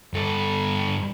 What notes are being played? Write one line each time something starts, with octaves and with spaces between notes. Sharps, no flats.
G2 A4